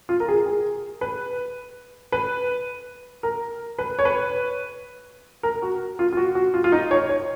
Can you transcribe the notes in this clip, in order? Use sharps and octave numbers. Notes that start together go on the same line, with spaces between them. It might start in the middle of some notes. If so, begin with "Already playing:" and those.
F4
A#4
G#4
G#4
B4
B4
A#4
B4
C#5
B4
A#4
F#4
F4
F4
F#4
F#4
F4
F4
D#4
C#5
C#5